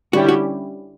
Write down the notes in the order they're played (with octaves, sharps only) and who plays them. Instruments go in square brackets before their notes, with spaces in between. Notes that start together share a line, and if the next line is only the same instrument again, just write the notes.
[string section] D3 G3 C#4 E4 G4 [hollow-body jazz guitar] F#4
[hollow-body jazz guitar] F#4